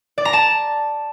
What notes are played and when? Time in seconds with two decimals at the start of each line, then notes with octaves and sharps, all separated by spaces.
0.18 D5
0.25 A#5
0.33 A5